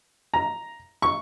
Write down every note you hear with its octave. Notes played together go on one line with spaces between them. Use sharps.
A#5
C#6